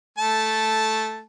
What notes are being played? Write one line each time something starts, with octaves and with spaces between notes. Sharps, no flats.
A3 A5